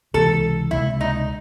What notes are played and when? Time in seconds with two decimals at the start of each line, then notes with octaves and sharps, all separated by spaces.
0.14 C#2 C3 E3 G#3 A4
0.71 C#2 C3 E3 G#3 E4
1.01 D#4